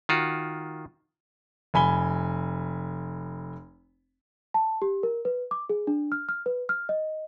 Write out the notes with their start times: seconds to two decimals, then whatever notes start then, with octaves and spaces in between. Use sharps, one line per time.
0.09 D#3 F4 F#4
1.74 F1 G#5 B5 G7
4.54 A5
4.82 G4
5.03 A#4
5.25 B4
5.51 D6
5.69 G#4
5.87 D4
6.12 F6
6.29 F6
6.46 B4
6.69 F6
6.89 D#5